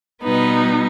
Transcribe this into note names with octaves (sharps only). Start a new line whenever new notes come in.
B2 G3 B3 D#4 B4